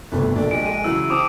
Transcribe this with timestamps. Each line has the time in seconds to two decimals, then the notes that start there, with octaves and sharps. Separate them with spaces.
0.12 G1 D2 C3 A4 B4
0.36 A#1 D4 A4
0.51 G#3 G4 G#5 D7
0.66 G#3 D#7
0.84 C#3 E3 F#3 E4 E6
1.10 C4 A5 D6 D#6